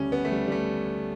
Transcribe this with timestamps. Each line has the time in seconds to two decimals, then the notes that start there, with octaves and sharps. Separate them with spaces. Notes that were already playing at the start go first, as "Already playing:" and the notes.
Already playing: D2 C#3 G3 C#4
0.12 B3
0.25 A3
0.32 G3
0.47 G3
0.52 A3